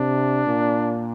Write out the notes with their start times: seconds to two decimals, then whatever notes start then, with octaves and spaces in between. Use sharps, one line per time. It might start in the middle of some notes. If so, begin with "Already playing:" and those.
Already playing: C3 D4
0.46 A#2